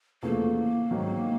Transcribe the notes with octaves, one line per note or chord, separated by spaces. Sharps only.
E2 C#3 F3 A3 A#3
G#2 D#3 F#3